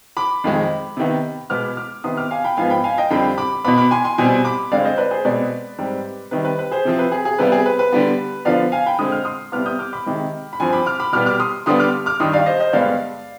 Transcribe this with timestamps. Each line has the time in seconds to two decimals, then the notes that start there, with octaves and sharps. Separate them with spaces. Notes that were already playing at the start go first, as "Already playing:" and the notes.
0.17 B5 D6
0.44 F2 D#3 G#3
0.97 C3 D#3 B3
1.50 B2 G#3 B3 D6 F6
1.77 D6 F6
2.04 C3 D#3 B3 C6 D#6
2.17 D6 F6
2.31 F5 G#5
2.44 G5 B5
2.57 G#2 F3 B3 F5 G#5
2.70 G5 B5
2.84 F5 G#5
2.98 D#5 G5
3.10 F2 D3 G3 C4 G5 B5
3.38 B5 D6
3.65 B2 B3 B5 D6
3.78 B5 D6
3.91 G#5 C6
4.04 G#5 C6
4.18 B2 G3 C4 G#5 C6
4.45 B5 D6
4.72 G2 D3 G#3 C4 D5 F5
4.84 C5 D#5
4.98 B4 D5
5.11 G#4 C5
5.25 B2 G#3 C4 B4 D5
5.79 G#2 G3 C4
6.31 C3 D#3 G3 B4
6.45 B4
6.59 B4
6.71 G#4 C5
6.85 C3 F3 C4
6.99 B4
7.12 G#4
7.25 G#4
7.39 C3 G3 B3 B4
7.52 G#4
7.66 B4
7.79 B4
7.92 D3 G3 B3
8.45 D3 F3 B3 D5 F5
8.72 F5 G#5
8.86 G5 B5
8.99 D3 G#3 C4 D#6
9.12 F6
9.25 C6 D#6
9.52 C3 G3 B3 D6 F6
9.66 D#6 G6
9.79 D6 F6
9.93 B5 D6
10.06 C3 D#3 G#3
10.53 B5
10.60 G2 F3 C4 G#5 C6
10.73 B5 D6
10.86 D6 F6
11.00 B5 D6
11.13 B2 G3 B3 D6 F6
11.26 D6 F6
11.40 C6 D#6
11.66 D3 G3 B3 C6 D#6
11.80 D6 F6
12.06 D6 F6
12.20 G2 D#3 G3 C6 D#6
12.33 D5 F5
12.46 C5 D#5
12.60 C5 D#5
12.73 G2 D3 G#3 B3 D5 F5